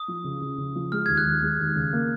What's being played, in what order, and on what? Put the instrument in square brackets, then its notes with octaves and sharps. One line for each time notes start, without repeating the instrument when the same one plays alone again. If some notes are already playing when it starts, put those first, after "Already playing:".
Already playing: [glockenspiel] D#6
[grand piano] F3
C#3
C#3
C#3
F3
[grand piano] G#3 [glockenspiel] F6
[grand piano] D#2 [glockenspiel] G#6
[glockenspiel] F#6
[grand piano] D#2
G#3
D#2
C#3
A#3